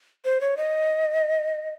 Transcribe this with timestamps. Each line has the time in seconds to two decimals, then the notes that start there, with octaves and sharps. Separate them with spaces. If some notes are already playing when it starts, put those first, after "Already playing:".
0.25 C5
0.41 C#5
0.57 D#5